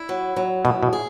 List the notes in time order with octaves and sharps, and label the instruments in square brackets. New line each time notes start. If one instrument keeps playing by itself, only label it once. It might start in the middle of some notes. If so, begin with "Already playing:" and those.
Already playing: [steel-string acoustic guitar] E4
F#3
F#3
[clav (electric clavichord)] B2 [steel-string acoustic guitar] E4
[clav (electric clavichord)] B2
[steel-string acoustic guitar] G#4